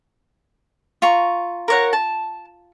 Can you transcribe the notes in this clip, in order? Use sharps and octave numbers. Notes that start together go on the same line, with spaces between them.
F4 A#5 C#6
A#4 C#5 F#5
A5